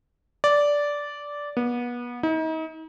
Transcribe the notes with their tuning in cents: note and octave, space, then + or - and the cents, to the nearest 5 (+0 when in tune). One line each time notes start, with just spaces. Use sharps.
D5 -10
B3 -30
D#4 +40